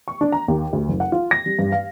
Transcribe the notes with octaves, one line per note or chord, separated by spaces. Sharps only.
C#6
D4
A#5
D#2
D2
F#1
F#5
F4
A#6
G3
G2
F5